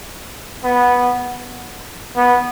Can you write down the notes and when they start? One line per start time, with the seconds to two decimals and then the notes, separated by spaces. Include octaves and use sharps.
0.64 B3
2.16 B3